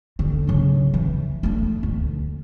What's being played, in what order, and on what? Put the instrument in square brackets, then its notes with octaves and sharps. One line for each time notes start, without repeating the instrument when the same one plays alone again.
[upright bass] D3
C#3 F#3
E3
A3 D4
D2